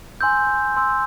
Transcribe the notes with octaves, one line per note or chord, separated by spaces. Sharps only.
G#5 C6 E6 G6
G#5 C6 E6 G6